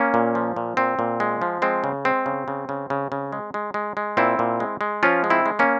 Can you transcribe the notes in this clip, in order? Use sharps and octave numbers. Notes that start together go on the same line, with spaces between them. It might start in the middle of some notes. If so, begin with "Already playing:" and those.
Already playing: A#3 C#4
A#2
F3
A#2
A#2 C4
A#2
G#3
F3
G#3 C4
C#3
G#3 C4
C#3
C#3
C#3
C#3
C#3
G#3
G#3
G#3
G#3
A#2 C4 E4
A#2
G#3
G#3
F3 C#4 F4
G#3
C4 E4
G#3
A#3 C#4